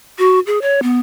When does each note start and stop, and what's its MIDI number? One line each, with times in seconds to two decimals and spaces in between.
0.18 0.40 66
0.47 0.59 68
0.62 0.80 73
0.83 1.00 59